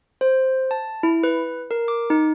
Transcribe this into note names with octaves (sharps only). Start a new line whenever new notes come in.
C5
A5
E4
B4
A#4
D6
D#4